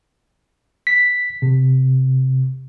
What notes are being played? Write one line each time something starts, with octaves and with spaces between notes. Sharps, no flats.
B6
C3